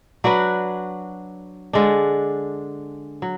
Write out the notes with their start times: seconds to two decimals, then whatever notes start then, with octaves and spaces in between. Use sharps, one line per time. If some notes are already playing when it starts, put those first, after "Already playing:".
0.24 F#3 D4 F#4 B4
1.73 D3 G#3 D4
3.22 F#3